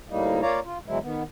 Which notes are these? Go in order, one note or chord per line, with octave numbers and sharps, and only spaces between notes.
D2 A2 G3 A#3 D#4
A#3 F4 C#5 D5 F5 A#5
F4
B2 E3 F#3 G#3 E4
D#3 B3